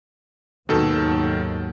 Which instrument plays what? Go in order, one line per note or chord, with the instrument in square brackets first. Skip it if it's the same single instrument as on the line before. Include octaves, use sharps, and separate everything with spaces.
[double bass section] D#2 G#2 F#3 [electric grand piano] B2 D#3 A4